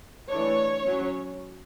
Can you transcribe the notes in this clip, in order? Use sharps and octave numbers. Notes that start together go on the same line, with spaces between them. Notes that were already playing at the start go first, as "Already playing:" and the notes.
E3 A3 D4 C#5
F#3 C#4